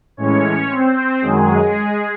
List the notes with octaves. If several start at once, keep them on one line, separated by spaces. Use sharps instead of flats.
A2 E3 G#3 C#4 C#5
C4 C5
F#2 D#3 F#3 G#3 G#4